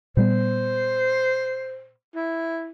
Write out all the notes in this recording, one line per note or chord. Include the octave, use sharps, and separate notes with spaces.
A#2 G3 B3 C5
E4